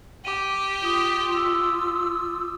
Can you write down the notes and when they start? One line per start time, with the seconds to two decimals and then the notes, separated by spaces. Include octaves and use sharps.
0.25 G4 D6 D#7
0.83 F4 D6 D#6 G7
1.34 E6